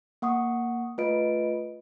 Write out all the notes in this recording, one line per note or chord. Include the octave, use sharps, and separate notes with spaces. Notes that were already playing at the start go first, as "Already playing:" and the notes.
A#3 F#5 C#6 D#6
A3 F4 B4 D#5 D7